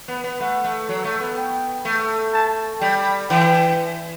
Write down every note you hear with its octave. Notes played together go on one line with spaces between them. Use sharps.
B3
B3
A3 F#5
A3
F#3
A3
B3
G5
A3
A5
G3 G5
E3 G5